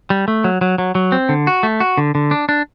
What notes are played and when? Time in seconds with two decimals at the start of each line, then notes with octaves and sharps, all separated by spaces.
0.10 G3
0.28 A3
0.44 F#3
0.61 F#3
0.78 F#3
0.95 F#3
1.12 C4
1.29 D3
1.47 F#4
1.63 A3
1.80 F#4
1.98 D3
2.15 D3
2.31 D4
2.49 D4